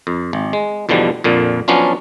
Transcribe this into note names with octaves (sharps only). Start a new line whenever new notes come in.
F2
G#1
G#3
E2 B2 D3 F3 G3
F2 A#2 D3
F3 F#3 B3 C#4 D4 F4